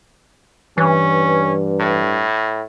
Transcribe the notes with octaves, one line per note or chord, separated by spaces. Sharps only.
G2 E3 C#4
A2